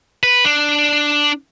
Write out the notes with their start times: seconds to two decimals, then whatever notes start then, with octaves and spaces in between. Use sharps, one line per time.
0.24 B4
0.45 D4